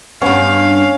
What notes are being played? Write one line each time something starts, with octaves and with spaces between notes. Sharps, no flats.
G2 B3 C#4 F5